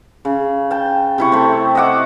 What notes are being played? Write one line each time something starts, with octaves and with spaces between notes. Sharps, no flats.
C#3
G5 A5
C3 E4 C#6
A3 C4
D#5 E5 F#5 D6